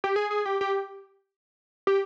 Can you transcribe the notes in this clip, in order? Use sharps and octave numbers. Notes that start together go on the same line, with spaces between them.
G4
G#4
G#4
G4
G4
G4